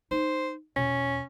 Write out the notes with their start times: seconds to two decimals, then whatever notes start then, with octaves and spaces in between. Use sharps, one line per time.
0.11 D#4 C5
0.76 E2 B2 C#4